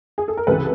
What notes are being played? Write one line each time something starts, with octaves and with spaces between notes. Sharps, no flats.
G#4
A4
A#4
C#2 C3 E3 A4 B4